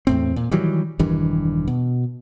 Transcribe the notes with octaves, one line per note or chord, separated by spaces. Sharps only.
E2 A2 C4
A#2
D#3 E3 F#3 G3
E1 G2 D#3 E3
B2